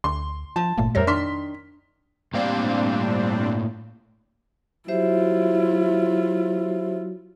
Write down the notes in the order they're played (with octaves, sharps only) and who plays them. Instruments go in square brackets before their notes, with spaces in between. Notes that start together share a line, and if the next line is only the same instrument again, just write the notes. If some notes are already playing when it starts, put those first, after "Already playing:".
[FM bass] D2 [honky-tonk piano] C6
[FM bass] F3 [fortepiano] A5
[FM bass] G1 [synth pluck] A#2 A3 A#3
[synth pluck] F2 C#5 A#6 [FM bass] G3 [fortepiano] A#4 C5 E5
[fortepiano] D#3 F6 [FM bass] D4 [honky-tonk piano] C6 B6
[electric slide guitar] A2 A#3 F5 [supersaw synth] G3 C4 D4
[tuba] F#3 [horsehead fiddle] E4 F4 [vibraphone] G4 C5 E5